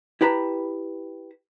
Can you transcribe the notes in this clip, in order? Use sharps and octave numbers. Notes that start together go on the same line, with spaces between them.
E4 G4 B4 A5 A#5